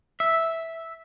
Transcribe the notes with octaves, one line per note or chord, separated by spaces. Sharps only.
E5